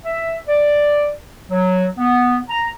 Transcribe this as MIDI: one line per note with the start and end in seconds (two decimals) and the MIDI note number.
0.04 0.36 76
0.48 1.10 74
1.50 1.86 54
1.98 2.36 59
2.49 2.67 82